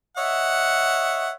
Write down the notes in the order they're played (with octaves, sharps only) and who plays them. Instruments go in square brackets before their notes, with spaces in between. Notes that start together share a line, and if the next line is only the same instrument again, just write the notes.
[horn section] C#5 D#5 E5 [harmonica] F#5